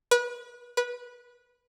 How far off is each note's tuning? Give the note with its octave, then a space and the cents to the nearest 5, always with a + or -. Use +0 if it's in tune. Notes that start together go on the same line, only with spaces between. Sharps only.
B4 -30
B4 -20